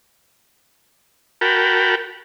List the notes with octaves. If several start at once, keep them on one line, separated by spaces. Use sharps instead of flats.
F#4 A#4 G5 A5 B5